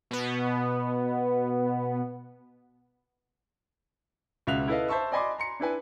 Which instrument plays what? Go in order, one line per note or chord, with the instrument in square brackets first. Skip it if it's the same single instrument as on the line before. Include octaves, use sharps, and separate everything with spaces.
[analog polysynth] B2 B3
[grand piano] C#2 B2 E5 F5 F#6 F7
E4 A4 B4 D#5 F5
C5 E5 A5 C#6 E6
D5 D#5 G#5 B5 C6 D6
A#5 C6 C#7
D4 E4 B4 G#5